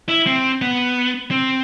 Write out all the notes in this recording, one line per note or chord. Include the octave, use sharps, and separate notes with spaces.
E4
C4
B3
C4